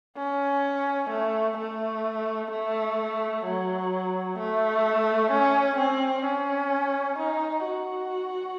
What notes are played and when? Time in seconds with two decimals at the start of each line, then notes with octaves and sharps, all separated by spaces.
0.18 C#4
1.11 A3
1.58 A3
2.51 A3
3.45 F#3
4.39 A3
5.32 C#4
5.79 C4
6.26 C#4
7.19 D#4
7.65 F#4